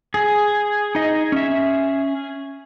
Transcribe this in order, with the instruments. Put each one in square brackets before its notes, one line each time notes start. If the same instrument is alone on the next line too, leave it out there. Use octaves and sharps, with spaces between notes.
[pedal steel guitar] G#4
[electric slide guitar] D#4 D#5
C#4 E5